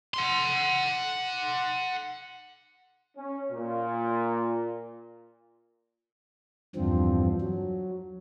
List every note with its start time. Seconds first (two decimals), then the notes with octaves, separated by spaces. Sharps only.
0.14 F#5 C6
3.17 C#4
3.52 A#2
6.76 E2 G2 D3 F3 C4
7.41 F#3